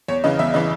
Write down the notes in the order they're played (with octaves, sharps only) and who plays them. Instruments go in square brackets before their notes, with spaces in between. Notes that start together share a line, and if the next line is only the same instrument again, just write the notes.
[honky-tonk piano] E2 C#5
C#3 E3 D#5
E2 E5
C#3 E3 D#5